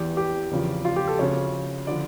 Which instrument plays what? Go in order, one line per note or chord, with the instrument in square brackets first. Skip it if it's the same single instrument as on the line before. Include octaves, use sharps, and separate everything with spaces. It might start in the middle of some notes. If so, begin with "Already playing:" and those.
Already playing: [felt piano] E2 E3 G4
G4
E2 C#3 F3
F4
G4
A4
D2 C#3 F3 C#5
D3 F3 D5